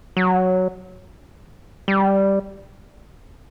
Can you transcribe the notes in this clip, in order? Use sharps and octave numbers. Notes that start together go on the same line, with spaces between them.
F#3
G3